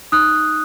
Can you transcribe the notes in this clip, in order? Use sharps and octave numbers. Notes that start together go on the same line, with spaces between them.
D#4 D#6 F#6